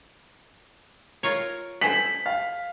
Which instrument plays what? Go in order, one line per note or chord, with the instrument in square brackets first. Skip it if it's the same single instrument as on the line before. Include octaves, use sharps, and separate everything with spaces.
[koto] F4 A#4 C#5
[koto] A4 C5 [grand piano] G#5 F#7 [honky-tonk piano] B6
[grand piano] F5